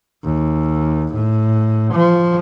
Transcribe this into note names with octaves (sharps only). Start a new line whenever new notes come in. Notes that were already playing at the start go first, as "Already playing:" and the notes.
D#2
A2
F3